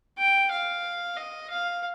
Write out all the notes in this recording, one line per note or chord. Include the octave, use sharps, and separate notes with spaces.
G5
F5
D#5
F5